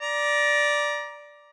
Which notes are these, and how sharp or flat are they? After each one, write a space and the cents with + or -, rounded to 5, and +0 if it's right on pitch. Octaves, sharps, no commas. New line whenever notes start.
D5 +0 A#5 +25